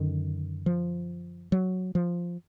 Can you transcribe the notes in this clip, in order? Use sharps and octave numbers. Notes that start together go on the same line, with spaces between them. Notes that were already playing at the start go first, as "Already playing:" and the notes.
Already playing: F#2 D3 D#3
F3
F#3
F3